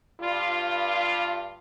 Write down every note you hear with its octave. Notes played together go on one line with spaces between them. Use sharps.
G2 F4